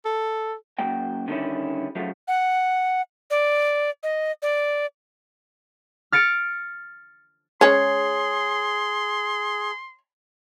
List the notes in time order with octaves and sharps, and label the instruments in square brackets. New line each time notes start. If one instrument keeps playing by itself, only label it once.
[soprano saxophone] A4
[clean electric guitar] F#2 F#3 A#3 G5
D3 D#3 G3 C4 C#4 E4
C#3 F3 F#3 A3 F4
[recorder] F#5
D5
D#5
D5
[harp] F6 A6 C#7 D7
[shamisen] G#3 C#4 [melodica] G#4 [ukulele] C#5 [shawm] C6